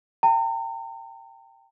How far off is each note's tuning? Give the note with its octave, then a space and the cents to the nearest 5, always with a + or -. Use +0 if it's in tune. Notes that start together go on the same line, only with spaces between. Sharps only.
G5 +0 A#5 -40